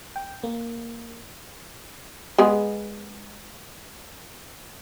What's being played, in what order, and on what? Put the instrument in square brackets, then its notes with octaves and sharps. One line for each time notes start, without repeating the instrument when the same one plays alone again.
[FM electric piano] G5
A#3
[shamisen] G#3 B3 G#4